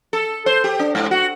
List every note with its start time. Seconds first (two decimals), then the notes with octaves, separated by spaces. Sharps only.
0.13 A4
0.46 C5
0.64 G4
0.79 D4
0.95 G#2
1.11 F#4